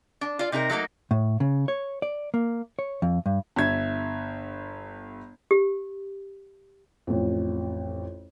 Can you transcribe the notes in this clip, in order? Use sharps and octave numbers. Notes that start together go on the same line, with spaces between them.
D4
F4 D5
C3 D#4 G4 A#4
F#3 A3 A#3 D#4
A2
C#3
C#5
D5
A#3
C#5
F2
G2
G1 E5 G#6
G4
A1 F2